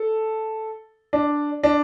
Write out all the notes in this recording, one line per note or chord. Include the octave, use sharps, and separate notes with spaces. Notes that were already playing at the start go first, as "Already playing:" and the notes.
Already playing: A4
D4
D4